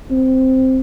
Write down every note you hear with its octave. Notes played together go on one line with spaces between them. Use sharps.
C4